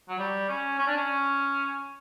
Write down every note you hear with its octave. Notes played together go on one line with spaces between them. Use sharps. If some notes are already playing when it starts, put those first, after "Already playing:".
F#3
G3
C#4
C#4
D4
C#4